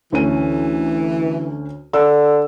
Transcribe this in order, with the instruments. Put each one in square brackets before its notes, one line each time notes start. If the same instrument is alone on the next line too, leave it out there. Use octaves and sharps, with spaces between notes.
[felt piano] D2 C#4 D#7 [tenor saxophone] E3
[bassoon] D3 [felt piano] E6